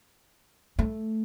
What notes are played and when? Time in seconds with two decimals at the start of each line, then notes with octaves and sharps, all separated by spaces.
0.79 A3